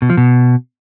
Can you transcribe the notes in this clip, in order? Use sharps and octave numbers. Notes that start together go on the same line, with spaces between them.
B2
F3
B2